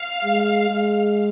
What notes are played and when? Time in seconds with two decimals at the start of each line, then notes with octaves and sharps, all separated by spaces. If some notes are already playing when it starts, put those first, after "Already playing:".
Already playing: F5
0.24 G#3
0.69 G#3